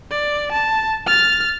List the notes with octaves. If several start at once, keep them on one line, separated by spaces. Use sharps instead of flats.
D5
A5
F6 A6